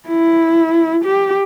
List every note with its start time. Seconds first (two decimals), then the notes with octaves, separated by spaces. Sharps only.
0.09 E4
1.04 G4